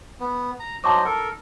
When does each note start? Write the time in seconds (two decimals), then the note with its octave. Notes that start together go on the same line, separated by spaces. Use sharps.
0.20 B3
0.60 A#5
0.84 F#3 C5 D#5 A5 C#6 D6
1.05 A4 A#4